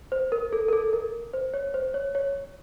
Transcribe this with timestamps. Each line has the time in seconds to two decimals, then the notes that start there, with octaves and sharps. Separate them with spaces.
0.12 C5
0.32 A#4
0.53 A4
0.68 A#4
0.73 A4
0.93 A#4
1.33 C5
1.54 C#5
1.74 C5
1.94 C#5
2.15 C#5